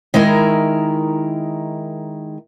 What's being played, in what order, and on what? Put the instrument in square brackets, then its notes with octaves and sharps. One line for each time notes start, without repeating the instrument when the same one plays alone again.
[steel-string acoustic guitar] D#3 G#3 E4 A#4